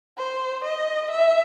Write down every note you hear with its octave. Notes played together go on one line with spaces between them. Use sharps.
C5
D#5
E5